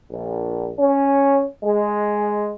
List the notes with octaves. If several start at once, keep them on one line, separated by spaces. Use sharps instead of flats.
A#1
C#4
G#3